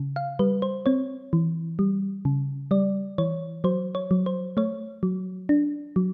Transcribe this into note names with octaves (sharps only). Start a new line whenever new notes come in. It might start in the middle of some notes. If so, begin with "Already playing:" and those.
Already playing: C#3
F5
G3 B4
C5
C4 C#5
E3
G3
C#3
G3 D5
E3 C#5
F#3 C5
C#5
F#3
C5
A3 C#5
F#3
D4
F#3